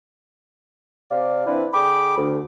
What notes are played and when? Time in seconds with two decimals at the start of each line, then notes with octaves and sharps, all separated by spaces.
1.11 C3 D5 F5
1.46 E3 C4 D4 E4 B4 D5
1.74 D3 G#4 G5 B5 D6
2.17 D2